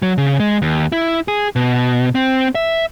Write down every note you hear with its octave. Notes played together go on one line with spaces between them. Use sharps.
F#3
C#3
G#3
D#2
E4
G#4
B2
C4
E5